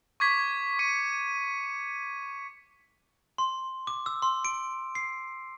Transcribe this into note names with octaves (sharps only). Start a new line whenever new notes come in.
C#6 D6 G#6 B6
C#6 C#7 D#7
C6
D6
E6
C6
D7
C7